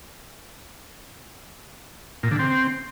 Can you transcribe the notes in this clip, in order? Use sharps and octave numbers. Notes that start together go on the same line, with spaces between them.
A#2
D3
C4